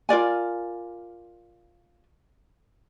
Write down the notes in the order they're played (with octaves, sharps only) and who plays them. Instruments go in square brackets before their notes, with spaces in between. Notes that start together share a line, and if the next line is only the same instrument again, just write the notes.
[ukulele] F4 A#4 D5 G#5